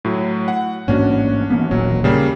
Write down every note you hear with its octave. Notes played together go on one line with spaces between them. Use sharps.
A2 F#3
F#5
A1 G#2 A#3 C#4 D4 F#4
E3 A#3 B3
D#1 A1 A#2 F#3
C#3 G3 A#3